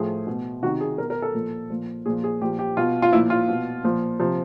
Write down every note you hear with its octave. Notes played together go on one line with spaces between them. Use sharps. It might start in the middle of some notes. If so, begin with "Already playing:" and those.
Already playing: A2 F3 G#4
B2
C3 D#3 F#4
G#4
B2 A#4
A#4
A4
A#2 F3
A#2 F3
A#2 F3 G#4
G#4
A#2 F3 G4
G4
B2 F4
F4
A#2 F3 E4
F4
B2
A#2 F3
C3 F3